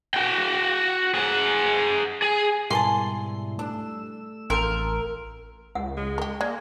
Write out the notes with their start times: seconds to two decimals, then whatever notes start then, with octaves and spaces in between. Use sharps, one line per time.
0.14 F#4 G5
1.14 G#4 F#5
2.22 G#4
2.70 G#2 B2 G3 E4 A#4 G#5 A5 C6
3.59 A3 D4 E6
4.50 A1 F3 C4 A#4
5.75 C#2 F#5
5.97 G#3
6.18 G4 A#4
6.41 G#3 A#3 D5